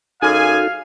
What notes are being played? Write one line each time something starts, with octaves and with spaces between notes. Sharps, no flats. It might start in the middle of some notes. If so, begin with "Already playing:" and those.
F#2 D#4 F#4 G#4 A4 F5 G#5